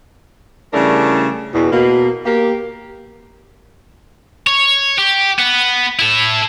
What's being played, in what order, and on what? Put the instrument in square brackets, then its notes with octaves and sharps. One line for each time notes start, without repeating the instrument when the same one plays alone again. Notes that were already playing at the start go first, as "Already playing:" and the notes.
[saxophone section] C#3 E3 G3 A3 D4 A#4
E2 B2
B2 A#3
A#3 G4
[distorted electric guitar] C#5
G4
B3
E4 A4